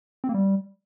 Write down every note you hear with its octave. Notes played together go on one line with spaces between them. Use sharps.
C4
A#3
G3